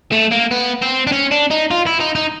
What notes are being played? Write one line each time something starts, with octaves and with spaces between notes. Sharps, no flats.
A3
A#3
B3
C4
D4
C#4
D4
D#4
F4
E4
D#4
D#4